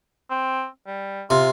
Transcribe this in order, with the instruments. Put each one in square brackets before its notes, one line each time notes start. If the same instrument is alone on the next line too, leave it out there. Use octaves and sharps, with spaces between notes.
[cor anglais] C4
G3
[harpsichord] C3 [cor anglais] F4